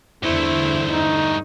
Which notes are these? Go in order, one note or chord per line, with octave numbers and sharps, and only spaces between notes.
E2 G2 D3 A3 E4 C5
D#4